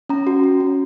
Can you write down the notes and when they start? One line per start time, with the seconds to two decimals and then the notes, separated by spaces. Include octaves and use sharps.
0.09 C#4 A#5
0.27 F#4
0.44 F#4
0.60 C#4